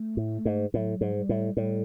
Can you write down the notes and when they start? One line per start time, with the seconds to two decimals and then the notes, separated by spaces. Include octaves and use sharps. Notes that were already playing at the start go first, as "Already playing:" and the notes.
Already playing: A3
0.17 A2
0.45 G#2
0.74 A2 F#3
1.01 G#2
1.15 G3
1.29 A2
1.57 A2 G3